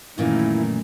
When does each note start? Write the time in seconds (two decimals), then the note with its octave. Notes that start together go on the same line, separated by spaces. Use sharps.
0.18 F#2 A#2 D#3 E3 A3 E4